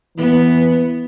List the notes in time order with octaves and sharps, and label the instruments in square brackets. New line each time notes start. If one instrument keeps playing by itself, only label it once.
[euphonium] E3 [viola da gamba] B3